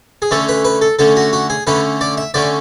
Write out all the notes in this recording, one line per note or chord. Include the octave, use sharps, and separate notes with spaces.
G#4
D3 A3 C#4 A4
B4
B4
A4
D3 A3 C#4 A4
F#4
F#4
G#4
D3 A3 C#4 B4
D5
E5
D3 A3 C#4 D5